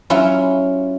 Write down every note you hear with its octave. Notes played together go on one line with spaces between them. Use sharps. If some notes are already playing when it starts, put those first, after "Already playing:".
F#3 C#4 E4 F4